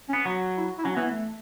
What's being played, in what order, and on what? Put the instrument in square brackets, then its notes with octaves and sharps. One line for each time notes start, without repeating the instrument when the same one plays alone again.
[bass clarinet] C#4
[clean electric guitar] B3
F#3
[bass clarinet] E4
E4
[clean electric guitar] F#3 [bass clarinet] C#4
[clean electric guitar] E3 [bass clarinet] B3
[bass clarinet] A3